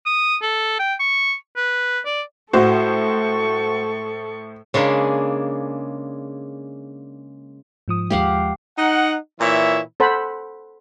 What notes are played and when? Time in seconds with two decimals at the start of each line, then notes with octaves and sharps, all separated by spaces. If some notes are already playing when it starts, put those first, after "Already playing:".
0.06 D#6
0.42 A4
0.79 G5
1.00 C#6
1.57 B4
2.05 D5
2.53 A2 F#4 A4 C5 C#6
4.74 C#3 G#3 A#3 D4
7.88 G#2 F3 D#6
8.10 D#2 F3 G#3 G4 F5 F#5
8.78 D#4 F#5
9.40 A#2 E3 E4 C#5 E5
10.00 A4 C5 F#5 B5